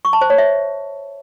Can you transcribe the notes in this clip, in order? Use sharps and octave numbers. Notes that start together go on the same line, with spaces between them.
C#6
A5
C5
C#5
E5